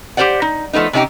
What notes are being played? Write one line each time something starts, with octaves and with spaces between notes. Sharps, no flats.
G4 A4 C5 D5 F#5
D#4
F3 F#3 A3 B3 D#4
C3 C#4 D#4 F#4 G4